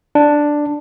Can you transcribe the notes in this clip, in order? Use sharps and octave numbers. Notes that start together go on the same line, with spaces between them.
D4